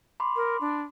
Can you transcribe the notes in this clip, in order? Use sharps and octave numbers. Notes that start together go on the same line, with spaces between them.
B5 C6 D6
A#4
D4